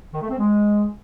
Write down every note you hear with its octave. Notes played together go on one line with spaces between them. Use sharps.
D#3
A3
C4
G#3